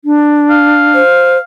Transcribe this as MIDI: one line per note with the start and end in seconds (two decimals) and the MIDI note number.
0.05 1.01 62
0.50 1.43 77
0.95 1.38 72